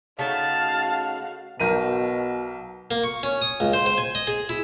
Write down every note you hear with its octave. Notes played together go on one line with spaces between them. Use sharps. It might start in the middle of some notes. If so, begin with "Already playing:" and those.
C#3 A3 D#4 F#4 F5 A5
B1 B2 A#4 D#7
A#3
C#6
C#4
D#6
C#2
C5
C5
G#5
D#5
G#4
E4